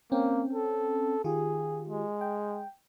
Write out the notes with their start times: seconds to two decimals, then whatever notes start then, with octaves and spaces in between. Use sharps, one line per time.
0.12 A#3 C4 C#4 G5
0.53 A4
1.24 D#3 F4 G4 G#4
1.89 G#3
2.21 G5